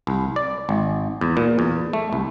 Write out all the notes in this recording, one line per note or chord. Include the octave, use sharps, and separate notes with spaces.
C2
D5
G#1
E2
A#2
E2
A3
C2